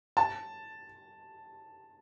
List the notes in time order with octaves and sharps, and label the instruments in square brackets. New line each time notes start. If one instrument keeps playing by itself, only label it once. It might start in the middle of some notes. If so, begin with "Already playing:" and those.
[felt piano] A5